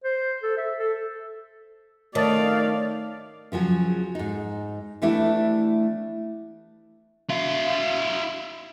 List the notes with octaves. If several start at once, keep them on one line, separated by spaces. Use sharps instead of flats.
C5
A4
E5
A4
D#3 A3 C#5 D5 F5 A5 A6
C#3 F3 F#3 G#4
G#2 D#4
E3 G3 A3 B3 D4 E4
E4 F5